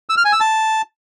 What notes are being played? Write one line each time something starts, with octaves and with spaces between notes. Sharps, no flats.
E6
F6
G#5
E6
A5